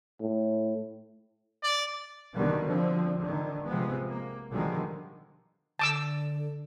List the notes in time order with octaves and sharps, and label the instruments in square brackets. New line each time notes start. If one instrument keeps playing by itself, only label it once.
[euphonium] A2
[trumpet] D5
[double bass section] B2 D3 D#3 G3 B3
D3 F3 C4
D3 D#3
C3 F3 G#3 B3
A#3
B2 D3 D#3 F3 G3 G#3
[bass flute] D3 [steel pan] A5 D6 E6